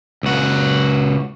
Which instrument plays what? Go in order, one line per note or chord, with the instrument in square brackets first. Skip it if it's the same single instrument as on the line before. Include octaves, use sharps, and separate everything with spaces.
[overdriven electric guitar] C#2 F#4